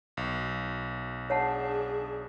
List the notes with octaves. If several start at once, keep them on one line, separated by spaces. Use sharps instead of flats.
B1
D4 G#4 C#5 F#5 A5